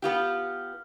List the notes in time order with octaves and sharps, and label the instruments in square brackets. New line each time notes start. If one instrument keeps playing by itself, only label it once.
[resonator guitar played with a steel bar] B3 F4 G4